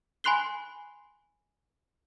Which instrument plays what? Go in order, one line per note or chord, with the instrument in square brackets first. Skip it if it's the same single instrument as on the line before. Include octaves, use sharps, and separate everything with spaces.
[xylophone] G#5 B5 C6 F#6 C7 G7